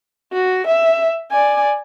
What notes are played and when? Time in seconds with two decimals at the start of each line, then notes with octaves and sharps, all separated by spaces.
0.33 F#4
0.67 E5
1.31 D5 G#5